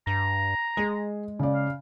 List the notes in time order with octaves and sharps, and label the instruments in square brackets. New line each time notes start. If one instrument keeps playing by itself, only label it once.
[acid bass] G2 [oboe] A#5
[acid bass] G#3 [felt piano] G#4
[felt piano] C#3 D5
[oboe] F5